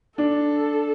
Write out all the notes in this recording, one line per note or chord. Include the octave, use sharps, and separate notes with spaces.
D4 A4